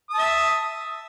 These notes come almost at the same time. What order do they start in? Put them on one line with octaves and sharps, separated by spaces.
D#6 A5 E5